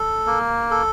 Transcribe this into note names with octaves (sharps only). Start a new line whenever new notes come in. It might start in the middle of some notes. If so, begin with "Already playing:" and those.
Already playing: A4
A#3
A4